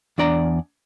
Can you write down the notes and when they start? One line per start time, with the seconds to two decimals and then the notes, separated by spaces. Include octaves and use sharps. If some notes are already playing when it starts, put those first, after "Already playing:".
0.18 E2 D4 D5 A#5